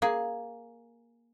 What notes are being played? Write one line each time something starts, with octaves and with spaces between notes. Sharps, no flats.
A#3 G#4